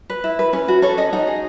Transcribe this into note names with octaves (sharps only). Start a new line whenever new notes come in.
B4
E4
B4
C#4 B4
F#4
A4 C#5
C#4 D#5
D#4 F#5
G#4